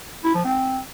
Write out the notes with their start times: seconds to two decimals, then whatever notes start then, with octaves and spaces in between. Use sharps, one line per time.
0.24 E4
0.35 F3
0.45 C4